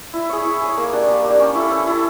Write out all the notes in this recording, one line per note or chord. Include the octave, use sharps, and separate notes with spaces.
E4
G#4 C#5
E4
G#4 C#5
A#3
D4 G4
A#3
D4 G4
C#4
E4 A4
C#4
E4 A4